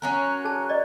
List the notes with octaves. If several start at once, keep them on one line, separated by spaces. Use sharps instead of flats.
F#3 C#4 A#4 F#6
G#4 A5
D5 D#5